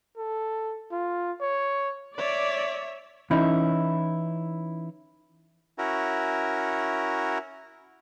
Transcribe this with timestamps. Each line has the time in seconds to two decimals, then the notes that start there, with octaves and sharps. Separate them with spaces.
0.17 A4
0.92 F4
1.41 C#5
2.17 C#5 D5 E5
3.31 E3 C#4 D#4 E4
5.78 C#4 E4 F#4 A#4